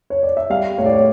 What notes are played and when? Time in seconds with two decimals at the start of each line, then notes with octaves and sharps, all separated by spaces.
0.10 C#5
0.23 D5
0.37 E5
0.50 G3 F5
0.78 A2 C#5
0.86 D5
0.93 C#5